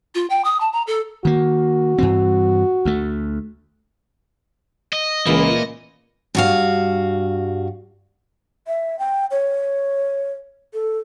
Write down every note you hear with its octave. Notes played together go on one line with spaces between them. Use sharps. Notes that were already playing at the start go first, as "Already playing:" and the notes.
F4
G5
D#6
A5
A#5
A4
D#3 A#3 F#4
G2 E3 C4
D2 A3
D#5
C#2 A#2 E3 A#3
G2 F#4 F5
E5
G5
C#5
A4